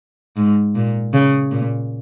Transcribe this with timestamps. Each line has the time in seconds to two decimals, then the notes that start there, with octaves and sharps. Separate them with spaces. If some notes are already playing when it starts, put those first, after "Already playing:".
0.37 G#2
0.75 A#2
1.13 C#3
1.51 A#2